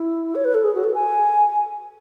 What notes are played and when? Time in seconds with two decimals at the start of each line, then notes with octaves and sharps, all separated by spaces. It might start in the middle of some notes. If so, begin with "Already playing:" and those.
Already playing: E4
0.35 C#5
0.45 B4
0.54 A4
0.64 G#4
0.74 F#4
0.84 A4
0.94 G#5